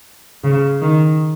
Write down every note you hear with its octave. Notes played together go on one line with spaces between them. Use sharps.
C#3
D#3